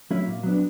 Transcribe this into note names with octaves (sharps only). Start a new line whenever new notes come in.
F#3 A3 C#4 E4
A#2
F#3 B3 D4